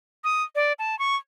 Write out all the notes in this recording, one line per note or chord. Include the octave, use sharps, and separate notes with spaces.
D#6
D5
A5
C#6